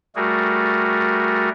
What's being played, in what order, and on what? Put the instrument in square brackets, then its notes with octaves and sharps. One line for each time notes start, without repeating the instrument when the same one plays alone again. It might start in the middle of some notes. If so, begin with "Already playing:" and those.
[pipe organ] G3 A3 F#4 G#4 A#4